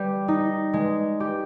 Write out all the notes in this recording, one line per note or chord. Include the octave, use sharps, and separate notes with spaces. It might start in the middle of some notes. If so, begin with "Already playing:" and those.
Already playing: G3
D#4
G#3
G4